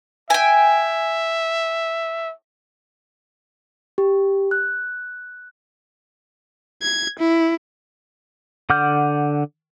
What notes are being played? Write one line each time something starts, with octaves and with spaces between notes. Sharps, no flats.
E5 G5 G#5
G4
F#6
G#6
E4
D3 F#5 D6 F6 G6